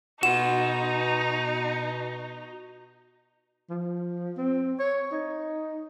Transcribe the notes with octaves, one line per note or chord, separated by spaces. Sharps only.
B2 D#4 F#4 F#5 C6 E7
F3
C4
C#5
D#4